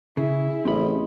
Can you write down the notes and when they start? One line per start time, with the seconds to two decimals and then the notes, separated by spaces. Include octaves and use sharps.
0.17 C#3 E4 G#4
0.65 A1 C4 C#4 D#5 B5